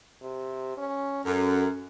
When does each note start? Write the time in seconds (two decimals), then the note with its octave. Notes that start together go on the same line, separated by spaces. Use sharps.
0.22 C3
0.77 C#4
1.25 F#2 A4